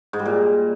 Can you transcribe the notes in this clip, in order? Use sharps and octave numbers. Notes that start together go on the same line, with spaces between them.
G#2
G3
A#2